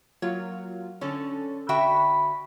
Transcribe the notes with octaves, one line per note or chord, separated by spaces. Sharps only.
F#3 A#3 F4 C#5
D3 C#4 A4
D3 F#4 E5 G5 B5